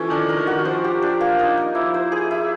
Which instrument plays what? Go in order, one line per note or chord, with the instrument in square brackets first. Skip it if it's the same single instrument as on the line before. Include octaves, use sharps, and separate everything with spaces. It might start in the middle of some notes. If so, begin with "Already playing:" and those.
Already playing: [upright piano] E3 F3 [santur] C#4 A4
[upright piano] D#3 [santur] D4
[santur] A#4
[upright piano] D#3
[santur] F#4
[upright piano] F3 [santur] C5
[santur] G4
D4
A#3
D#4
D#4
[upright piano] F3 [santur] E4
[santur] C5
G#4
E4